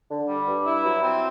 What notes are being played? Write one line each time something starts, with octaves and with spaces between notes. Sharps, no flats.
D3
G3
G2
E4
F#3
C4